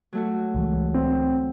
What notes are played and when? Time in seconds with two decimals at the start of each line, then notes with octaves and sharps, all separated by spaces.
0.13 F#3 A3 F#4
0.54 C#2 E3 G#3
0.94 C4